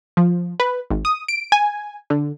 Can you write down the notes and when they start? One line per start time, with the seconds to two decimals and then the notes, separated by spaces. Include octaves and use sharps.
0.17 F3
0.60 B4
0.90 G#1
1.05 D#6
1.28 D7
1.52 G#5
2.10 D3